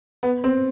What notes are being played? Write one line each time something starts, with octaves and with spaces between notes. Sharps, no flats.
B3
C4